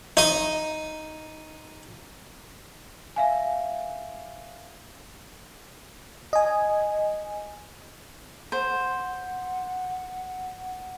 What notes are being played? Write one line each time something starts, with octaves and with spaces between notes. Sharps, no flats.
D#4 D#5
E5 F5 G#5
D#5 G#5
C5 F#5